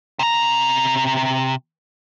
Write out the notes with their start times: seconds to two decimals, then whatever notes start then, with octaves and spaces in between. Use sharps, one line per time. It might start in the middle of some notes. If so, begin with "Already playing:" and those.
0.19 C3 A#5